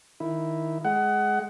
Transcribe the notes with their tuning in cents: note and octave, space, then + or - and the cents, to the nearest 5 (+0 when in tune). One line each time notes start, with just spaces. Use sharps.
D#3 +0 E4 +0
G#3 +10 F#5 +20